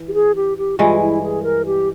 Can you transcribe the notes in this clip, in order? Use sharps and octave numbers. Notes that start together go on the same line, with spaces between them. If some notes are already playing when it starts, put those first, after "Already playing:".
Already playing: E3
G4
G#4
G4
G4
G2 E3 G#3 F4
E4
G#4
A#4
G4